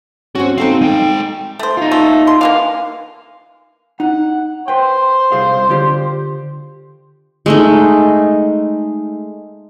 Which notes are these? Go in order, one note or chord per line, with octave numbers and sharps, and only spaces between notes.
C4 C#4 F#4
C4 D#4 A4 F5
G#3 G5
A3 C5
D#4 F4
A3
C6
D3 E3 A#3 F5
D#4 F#5
B4 C5 G5
C2 G#4 F5
D3 F4 G4
G#3 A3 D#4